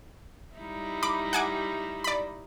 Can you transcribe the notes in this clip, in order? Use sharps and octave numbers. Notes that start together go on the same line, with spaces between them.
G3 D#4 E4
B5 D6
F#5 G#5 D6
D5 B5